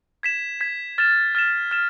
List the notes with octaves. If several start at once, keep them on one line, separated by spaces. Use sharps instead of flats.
G#6 B6 E7
G#6 B6 E7
F6 A6 E7
F6 A6 E7
F6 A6 E7